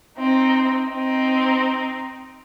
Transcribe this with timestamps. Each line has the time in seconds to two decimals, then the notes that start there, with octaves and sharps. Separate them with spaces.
0.18 C4 D#4
0.89 C4 D#4